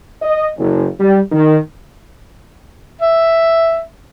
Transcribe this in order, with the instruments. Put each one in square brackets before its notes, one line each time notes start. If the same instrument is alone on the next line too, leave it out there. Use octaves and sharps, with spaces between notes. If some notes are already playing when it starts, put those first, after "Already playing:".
[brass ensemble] D#5
F#1
G3
D#3
[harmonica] E5